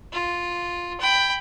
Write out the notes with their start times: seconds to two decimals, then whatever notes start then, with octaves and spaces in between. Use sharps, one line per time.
0.13 F4
1.00 G5 B5